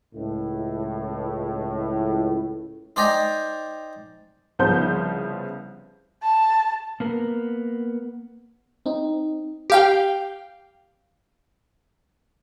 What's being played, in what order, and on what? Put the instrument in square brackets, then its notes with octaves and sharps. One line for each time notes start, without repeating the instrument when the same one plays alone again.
[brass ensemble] C#2 A2
[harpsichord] D#4 C5 D5 G5 G#5 A#5
[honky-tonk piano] C2 C#3 F3 B3 C5 G6
[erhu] A5
[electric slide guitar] A#3 B3 A#4
[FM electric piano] C4 D#4
[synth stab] G4 F5 G5